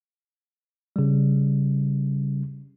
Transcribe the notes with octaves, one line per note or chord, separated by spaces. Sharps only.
C#3 G3